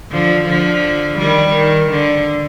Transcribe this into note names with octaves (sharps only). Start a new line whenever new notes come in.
D3 F3
D3 F3
D#3 G3
D#3
D3